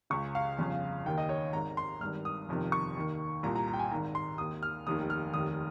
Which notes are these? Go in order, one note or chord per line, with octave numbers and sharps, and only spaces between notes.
C#2 C#3 C#6
F5
G1 F2 C#3
D#2 D#3 G5
D#5
C#5
G#1 G#2 D#3 A#5
C6
G#1 G2 D#3 F6
D#6
G1 F2 C3 D#3
C#6
D#2 D#3
C2 A#2 A#5
A#5
A#5
G5
G#5
G#1 G#2 D#3 A#5
C6
D#2 D#3 D#6
F6
F1 D#2 D#3 D#6
F6
F1 D#2 D#3 D#6